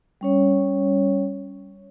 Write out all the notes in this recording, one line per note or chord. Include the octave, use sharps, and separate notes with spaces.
G3 C#4 C#5